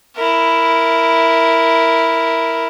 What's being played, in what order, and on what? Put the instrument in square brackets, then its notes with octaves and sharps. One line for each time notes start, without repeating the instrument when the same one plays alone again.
[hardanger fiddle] E4 A#4